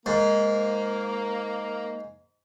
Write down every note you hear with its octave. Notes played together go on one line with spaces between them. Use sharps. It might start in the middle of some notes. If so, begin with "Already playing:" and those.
G#2 A#3